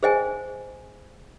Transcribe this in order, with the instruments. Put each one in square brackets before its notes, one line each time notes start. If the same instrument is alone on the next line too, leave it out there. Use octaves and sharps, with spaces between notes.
[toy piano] G#4 C5 D#5 G5 G#5